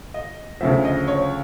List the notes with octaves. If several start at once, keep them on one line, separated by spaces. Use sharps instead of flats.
D#5
D2 C#3 F3 E5
D#5
C#5